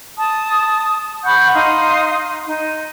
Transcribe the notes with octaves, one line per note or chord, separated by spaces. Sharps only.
A5 D#6
F#5 B5 C#6 G6
D#4 F5 C6 D#6
D#4